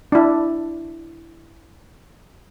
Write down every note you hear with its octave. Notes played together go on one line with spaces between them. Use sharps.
D4 E4